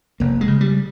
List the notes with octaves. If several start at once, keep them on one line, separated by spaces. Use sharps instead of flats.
F1 A#3
G#3
C#3
G3